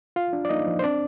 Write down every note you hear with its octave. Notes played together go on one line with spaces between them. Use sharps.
F4 F5
D4
D5
A#3 D#4 D#5
F3
C5
C4 D4 D5